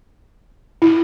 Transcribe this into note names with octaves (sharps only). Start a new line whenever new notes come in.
E4